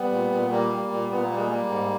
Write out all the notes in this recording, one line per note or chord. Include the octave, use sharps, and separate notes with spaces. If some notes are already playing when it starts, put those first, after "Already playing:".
Already playing: G3 B3
A#2
A#2
G3 A#3
G3
A#2
A#2 B3
A#3
G3
G#3
G3 A#3
G#2